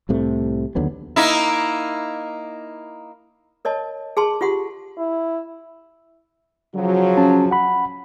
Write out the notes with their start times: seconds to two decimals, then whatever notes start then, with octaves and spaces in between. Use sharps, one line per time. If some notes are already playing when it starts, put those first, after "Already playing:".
0.09 C2 A2 C3 A3
0.75 D#2 D3 F#3 B3
1.16 A#3 D#4 E4
3.65 A#4 C#5 D#5 A5
4.17 G#4 A5 C6
4.41 F4 G4 F#5 C6
4.97 E4
6.75 C#3 F3 F#3
7.18 C#4 A5
7.51 F#5 B5